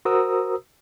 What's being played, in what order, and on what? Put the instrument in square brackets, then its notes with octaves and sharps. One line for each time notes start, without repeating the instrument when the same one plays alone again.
[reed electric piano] F#4 A#4 C5 A#5 D#6 E6